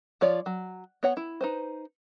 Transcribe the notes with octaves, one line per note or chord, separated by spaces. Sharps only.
F3 F4 C#5 D5
F#3
B3 C#5 F#5
E4
D#4 B4 C5